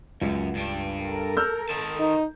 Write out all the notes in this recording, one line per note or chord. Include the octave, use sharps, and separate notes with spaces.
C#2 F#2
G2 D4
A4 A#4
E6 F6 G6
D#3 A5
D#4